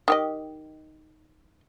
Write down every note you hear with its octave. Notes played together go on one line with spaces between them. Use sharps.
D#3 G4 D#5